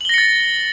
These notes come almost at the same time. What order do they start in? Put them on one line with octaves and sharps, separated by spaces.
F#7 G7 A#6 C#7 A6